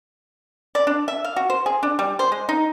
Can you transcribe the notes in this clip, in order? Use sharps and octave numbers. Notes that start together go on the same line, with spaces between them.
D5
D4
E5
F5
F#4
C5
G#4
D4
G3
C5
G#3
D#4